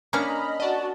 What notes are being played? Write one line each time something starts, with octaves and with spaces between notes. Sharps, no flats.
A#3 C#4 D4 D#5 A#5 B5 F6
F#4 D5 D#5 A5